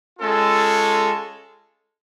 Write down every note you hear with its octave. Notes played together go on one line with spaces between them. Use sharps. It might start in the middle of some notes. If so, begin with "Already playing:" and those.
G#3 C#4 F4 A4